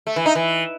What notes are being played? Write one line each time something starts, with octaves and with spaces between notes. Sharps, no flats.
A3
E3
D#4
E3